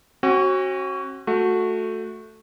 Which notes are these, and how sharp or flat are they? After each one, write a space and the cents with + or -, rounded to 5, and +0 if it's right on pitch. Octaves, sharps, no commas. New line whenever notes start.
C#4 -45 F#4 +15
A3 +0 F#4 -15